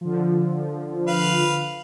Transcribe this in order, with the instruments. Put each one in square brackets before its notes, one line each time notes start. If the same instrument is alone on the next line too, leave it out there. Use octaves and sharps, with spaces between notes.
[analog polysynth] D3 F3
[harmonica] B4 F5